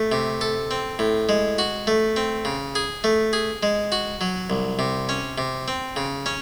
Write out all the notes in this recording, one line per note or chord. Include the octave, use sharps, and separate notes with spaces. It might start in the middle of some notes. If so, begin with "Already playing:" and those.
Already playing: A3
C3
A4
C4
A2
G#3
F#4
A3
C4
C#3
G#4
A3
G#4
G#3
F#4
F#3
C2
C3
C#4
C3
C4
C#3
C#4